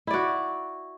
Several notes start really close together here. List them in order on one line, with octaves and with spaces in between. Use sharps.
E4 D5 F#4